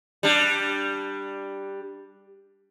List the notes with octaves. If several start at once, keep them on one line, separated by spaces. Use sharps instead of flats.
G3 D4